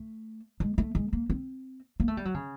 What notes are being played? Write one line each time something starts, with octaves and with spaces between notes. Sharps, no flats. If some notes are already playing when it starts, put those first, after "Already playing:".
Already playing: A3
G#3
A3
G#3
A#3
C4
A#3
A3
G3
F#3
C#3